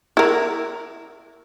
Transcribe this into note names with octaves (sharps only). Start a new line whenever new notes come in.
E4 A#4